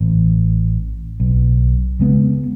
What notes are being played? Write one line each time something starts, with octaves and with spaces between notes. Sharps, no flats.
A1
B1
C#3 G#3 B3